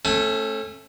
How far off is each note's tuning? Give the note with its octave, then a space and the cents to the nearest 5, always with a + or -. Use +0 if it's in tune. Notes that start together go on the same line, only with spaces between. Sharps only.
A3 +0 C#4 -35 G#5 +35